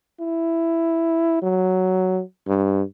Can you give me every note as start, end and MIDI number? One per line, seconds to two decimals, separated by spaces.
0.20 1.38 64
1.42 2.21 54
2.48 2.82 43